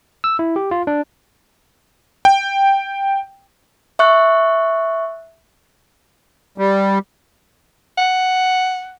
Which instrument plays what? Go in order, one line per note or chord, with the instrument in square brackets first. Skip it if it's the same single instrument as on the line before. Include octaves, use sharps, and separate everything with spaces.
[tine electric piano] E6
E4
G4
F4
D4
[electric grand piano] G5
[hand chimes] E5 C#6 F#6
[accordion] G3
[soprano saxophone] F#5